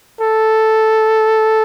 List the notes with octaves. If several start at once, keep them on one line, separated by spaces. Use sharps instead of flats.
A4